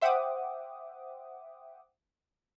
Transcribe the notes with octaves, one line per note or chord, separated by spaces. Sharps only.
C5 E5 F#5 G5 D6 D#6